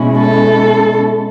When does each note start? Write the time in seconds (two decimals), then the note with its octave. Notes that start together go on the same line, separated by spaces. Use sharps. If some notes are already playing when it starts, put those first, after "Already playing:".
Already playing: B2 G#3 C#4 E4
0.16 A4